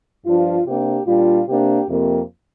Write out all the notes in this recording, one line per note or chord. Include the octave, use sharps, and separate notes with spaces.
G2 F3 D4 F4
C3 A#3 D4 G4
A#2 G3 D4 F4
C3 A#3 D4 G4
F2 C3 A#3